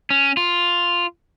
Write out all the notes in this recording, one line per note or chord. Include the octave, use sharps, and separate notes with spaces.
C#4
F4